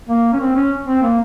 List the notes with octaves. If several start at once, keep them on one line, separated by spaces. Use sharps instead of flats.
A#3
C#4
C4
C#4
C4
A#3